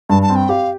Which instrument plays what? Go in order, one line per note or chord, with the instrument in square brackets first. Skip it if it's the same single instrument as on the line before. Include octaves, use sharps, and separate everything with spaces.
[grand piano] G2 [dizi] A5
[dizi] A5
[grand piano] C4
[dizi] G5
[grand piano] G4 [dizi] F5